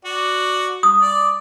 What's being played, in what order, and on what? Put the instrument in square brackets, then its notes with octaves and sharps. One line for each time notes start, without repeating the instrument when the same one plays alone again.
[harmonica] F#4 D5
[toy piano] D#6
[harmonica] D5